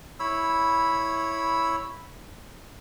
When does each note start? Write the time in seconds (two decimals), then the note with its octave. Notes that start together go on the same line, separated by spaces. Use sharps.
0.20 E4 C#5 B5 E6